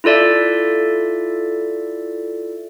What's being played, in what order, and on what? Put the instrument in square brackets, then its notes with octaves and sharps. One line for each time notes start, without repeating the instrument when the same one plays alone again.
[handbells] E4 F4 A4 D5 E5